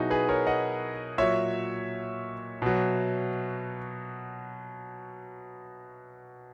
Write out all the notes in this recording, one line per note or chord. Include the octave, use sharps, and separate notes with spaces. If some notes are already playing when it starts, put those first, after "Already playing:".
Already playing: B2 F#3 D#4 E4 F#4 G#4
G#4 B4
A#4 C#5
D#5 F#5
A#2 F#3 C#5 E5
B2 F#3